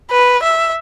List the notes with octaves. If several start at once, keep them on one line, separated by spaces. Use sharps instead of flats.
B4
E5